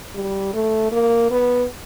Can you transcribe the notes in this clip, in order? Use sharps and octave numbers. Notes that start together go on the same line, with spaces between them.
G3
A3
A#3
B3